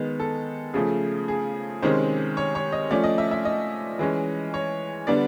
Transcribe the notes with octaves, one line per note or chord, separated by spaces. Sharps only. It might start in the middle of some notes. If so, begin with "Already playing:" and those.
Already playing: D#3 G#3 B3
A4
C#3 F3 A3 G#4
G#4
C3 D#3 G#3 C#4 C5
C#5
C#5
D#5
F3 A3 C#4 D5
D#5
E5
E5
D#5
E3 G#3 C#4
C#5
D3 G3 B3 D4 D5